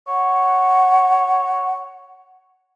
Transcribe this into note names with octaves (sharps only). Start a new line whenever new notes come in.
C#5 F#5